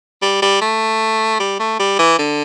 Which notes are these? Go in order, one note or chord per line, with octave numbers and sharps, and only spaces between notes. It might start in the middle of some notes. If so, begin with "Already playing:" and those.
G3
G3
A3
G3
A3
G3
E3
D3